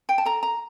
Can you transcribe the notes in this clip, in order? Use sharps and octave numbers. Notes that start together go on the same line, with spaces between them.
G5
A5
A4 A#5
A#5